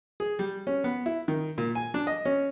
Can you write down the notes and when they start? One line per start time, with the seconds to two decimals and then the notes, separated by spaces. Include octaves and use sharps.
0.20 G#4
0.39 G3
0.67 C#4
0.84 B3
1.06 E4
1.28 D#3
1.58 A#2
1.75 G#5
1.94 D4
2.07 D#5
2.25 C#4